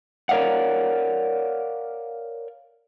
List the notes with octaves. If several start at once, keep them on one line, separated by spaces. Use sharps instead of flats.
A#4 C#5 D5 F5 F#5